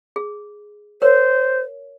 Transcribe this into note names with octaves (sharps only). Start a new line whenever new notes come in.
G#4
A#4 C5 C#5